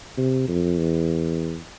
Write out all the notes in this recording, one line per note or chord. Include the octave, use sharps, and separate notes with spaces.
C3
F2
E2